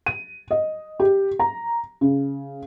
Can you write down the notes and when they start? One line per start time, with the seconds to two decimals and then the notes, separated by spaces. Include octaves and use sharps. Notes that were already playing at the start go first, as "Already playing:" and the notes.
0.06 D#7
0.51 D#5
1.00 G4
1.40 A#5
2.01 C#3